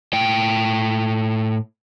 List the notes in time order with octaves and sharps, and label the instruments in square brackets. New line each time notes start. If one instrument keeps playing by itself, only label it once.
[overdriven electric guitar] A2 G5